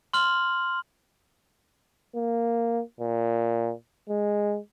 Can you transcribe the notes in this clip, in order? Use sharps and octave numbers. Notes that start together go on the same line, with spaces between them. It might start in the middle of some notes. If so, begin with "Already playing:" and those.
C6 F6 F#7
A#3
A#2
G#3